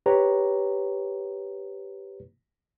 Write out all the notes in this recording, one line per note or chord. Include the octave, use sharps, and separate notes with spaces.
G4 B4 C#5 A#5